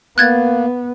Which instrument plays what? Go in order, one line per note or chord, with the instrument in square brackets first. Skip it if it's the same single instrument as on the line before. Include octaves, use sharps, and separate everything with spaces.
[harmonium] A#3 [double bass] B3 [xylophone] F#6 G#6 A6